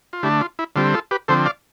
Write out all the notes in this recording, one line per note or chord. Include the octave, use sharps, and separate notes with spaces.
F4
D3 A3 D4 E4 G4
F4
E4
D3 G3 C4 F4
F4 A4
G4 B4
D3 F3 C4 A4 C5
D5 F5